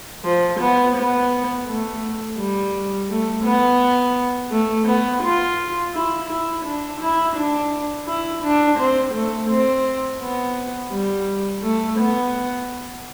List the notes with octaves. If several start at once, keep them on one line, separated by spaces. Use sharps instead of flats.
F3
B3
B3
A3
G3
A3
B3
A3
B3
F4
E4
E4
D4
E4
D4
E4
D4
C4
A3
C4
B3
G3
A3
B3